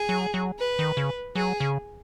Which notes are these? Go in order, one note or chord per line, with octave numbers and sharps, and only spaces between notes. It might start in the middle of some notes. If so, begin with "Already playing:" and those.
Already playing: G#4
F#3
F#3
B4
D#3
C#3
F#3 G#4
C#3